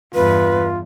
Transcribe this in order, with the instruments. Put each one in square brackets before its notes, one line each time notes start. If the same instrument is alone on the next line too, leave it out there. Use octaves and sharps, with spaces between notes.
[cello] E2 G2 [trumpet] F4 [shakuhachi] B4